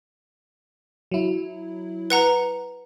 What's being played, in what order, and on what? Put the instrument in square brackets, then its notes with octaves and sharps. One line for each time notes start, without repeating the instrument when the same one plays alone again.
[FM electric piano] F#3 E4
[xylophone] B4 F#5 A#5